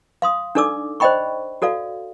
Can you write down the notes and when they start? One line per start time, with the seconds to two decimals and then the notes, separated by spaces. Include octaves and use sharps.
0.22 F5 C6 D#6
0.55 D4 D#4 A4 D5 D6 E6
1.00 C5 D5 D#5 G5 B5 C#6
1.62 F#4 A4 D5 F5